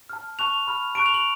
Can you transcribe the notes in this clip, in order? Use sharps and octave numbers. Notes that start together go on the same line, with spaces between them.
A5 F6
A5 C#6 F#6 F7
B5 F6
A5 C#6 F#6 D7
F7
F#7